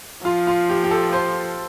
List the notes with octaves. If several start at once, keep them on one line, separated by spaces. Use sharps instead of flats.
F3 F4
F4
G4
G4
A4
C5